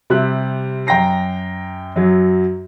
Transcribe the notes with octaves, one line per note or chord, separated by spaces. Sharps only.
C3 G3 E5 F#6
F#2 G5 A#5 A#6 C7
F#2 F#3